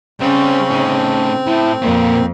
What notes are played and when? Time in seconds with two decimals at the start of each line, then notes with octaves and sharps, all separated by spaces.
0.20 C#3 G3 C4 C#4 C5
0.70 A2 D#4
1.46 A2 E4
1.82 F2 A#2 A#3 B3